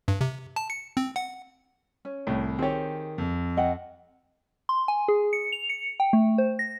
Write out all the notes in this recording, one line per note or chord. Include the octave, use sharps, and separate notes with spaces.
G2
C3
A5
C#7
C4
F#5
C#4
C2 A2
D#3 C4 G4 G#4 C#5
F2
D#5 F#5 G5
C6
G#5
G#4
C#7
F7
C#7
G5
A3
C5
A#6